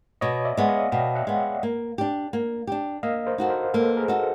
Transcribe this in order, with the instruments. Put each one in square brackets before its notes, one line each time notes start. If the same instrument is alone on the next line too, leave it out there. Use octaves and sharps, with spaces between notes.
[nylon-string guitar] B2 [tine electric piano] C#5 D#5
[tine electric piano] D5 E5
[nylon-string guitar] G#3 B3
[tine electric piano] D#5 F5
[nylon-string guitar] B2 [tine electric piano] F5 G5
[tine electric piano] E5 F#5
[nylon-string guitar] G#3 B3
A#3
D4 G4
A#3
D4 G4
[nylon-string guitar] A#3 [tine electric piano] D#5 F5
[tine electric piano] A#4 C5
[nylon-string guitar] D#4 F#4 A4
[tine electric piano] A#4 C5
[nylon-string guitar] A#3 [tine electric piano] A4 B4
[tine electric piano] G#4 A#4
[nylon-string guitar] D#4 F#4 A4